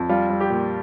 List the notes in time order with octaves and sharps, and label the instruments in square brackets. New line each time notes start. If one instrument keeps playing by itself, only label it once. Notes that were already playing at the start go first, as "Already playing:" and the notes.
Already playing: [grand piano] F2
G3 F4
G3
G4
A#2